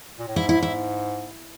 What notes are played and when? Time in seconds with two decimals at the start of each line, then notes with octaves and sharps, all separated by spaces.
0.19 A#2
0.28 A2
0.36 G#2 E4
0.49 E4
0.63 E4